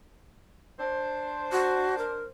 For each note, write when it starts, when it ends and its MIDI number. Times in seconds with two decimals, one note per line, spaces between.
0.78 2.30 62
0.78 2.30 72
1.52 1.98 66
1.98 2.23 70